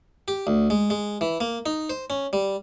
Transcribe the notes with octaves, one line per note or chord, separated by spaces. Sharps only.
G4
D2
G#3
G#3
E3
A#3
D#4
C5
C#4
G3